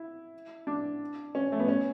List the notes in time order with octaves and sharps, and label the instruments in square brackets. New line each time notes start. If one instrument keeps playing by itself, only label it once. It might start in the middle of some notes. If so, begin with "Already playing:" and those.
Already playing: [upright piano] E4
D4
C#4
A3
B3
C#4